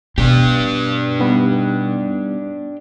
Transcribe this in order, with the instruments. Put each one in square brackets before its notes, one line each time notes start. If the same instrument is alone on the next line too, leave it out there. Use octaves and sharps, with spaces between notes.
[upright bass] B2 [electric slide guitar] D4 G4
[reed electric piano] G3 B3 D#4